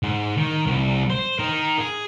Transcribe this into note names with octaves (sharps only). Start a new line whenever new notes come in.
G#2
D#3
C2
C5
D#4 A#4
G#4